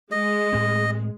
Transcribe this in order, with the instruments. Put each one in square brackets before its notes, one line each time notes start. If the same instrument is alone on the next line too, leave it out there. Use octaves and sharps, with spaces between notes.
[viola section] G#3 [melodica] D#5
[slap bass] A2 C4